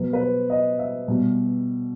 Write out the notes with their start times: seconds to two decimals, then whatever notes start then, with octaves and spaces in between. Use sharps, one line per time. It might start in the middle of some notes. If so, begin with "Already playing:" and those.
Already playing: B2 F#3 B4
0.13 B4
0.20 C5
0.50 D#5
0.79 E5
1.08 B2 G3